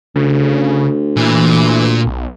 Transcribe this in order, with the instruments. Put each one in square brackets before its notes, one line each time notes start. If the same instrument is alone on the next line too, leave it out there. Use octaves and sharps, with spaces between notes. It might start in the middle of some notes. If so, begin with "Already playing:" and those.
[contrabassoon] D2 [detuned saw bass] C#3
[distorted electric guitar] A#2 [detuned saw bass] E3
[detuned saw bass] B1